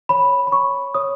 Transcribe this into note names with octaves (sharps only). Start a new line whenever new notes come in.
C#5 B5
B5
C#5 C#6
C#5 D#6